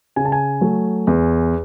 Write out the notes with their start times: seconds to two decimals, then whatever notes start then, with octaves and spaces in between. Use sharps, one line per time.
0.16 C#3 G#5
0.25 A5
0.32 G#5
0.61 F#3 A3
1.07 E2